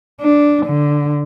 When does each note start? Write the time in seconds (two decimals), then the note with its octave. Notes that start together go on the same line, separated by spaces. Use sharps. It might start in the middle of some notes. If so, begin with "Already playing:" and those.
0.21 D4
0.66 D3